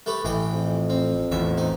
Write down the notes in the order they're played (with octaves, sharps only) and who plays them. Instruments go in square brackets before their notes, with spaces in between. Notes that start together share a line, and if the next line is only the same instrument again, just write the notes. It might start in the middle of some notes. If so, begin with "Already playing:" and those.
[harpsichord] A3 G4 B4
[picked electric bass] A1 [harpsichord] E3 D#5 G5
[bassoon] F2
[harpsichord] C4
[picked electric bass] A1 E2 [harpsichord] E5
[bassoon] C4 [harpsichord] D#4